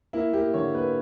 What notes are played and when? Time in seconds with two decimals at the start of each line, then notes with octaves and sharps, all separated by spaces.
0.13 A#3 E4
0.33 A#3 G4
0.54 D3 C#5
0.74 A#3 B4